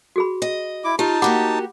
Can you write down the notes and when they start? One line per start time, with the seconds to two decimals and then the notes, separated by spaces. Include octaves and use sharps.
0.16 F#4 G#4 B5
0.42 D#5
0.84 E4 D6
0.99 D#4 F4 G4 A5
1.22 A#3 F#4 G4 F#5 B5 D6